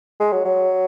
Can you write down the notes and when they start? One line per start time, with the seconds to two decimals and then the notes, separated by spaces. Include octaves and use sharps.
0.20 G#3
0.32 F#3
0.45 F#3